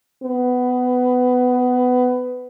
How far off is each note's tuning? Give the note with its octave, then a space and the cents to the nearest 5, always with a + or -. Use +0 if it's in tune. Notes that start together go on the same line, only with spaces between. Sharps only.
B3 +20